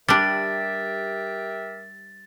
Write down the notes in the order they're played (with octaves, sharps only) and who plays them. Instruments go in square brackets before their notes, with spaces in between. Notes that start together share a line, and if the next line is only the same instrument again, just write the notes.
[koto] G3 D4 [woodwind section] G4 A#4 E5 [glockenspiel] A6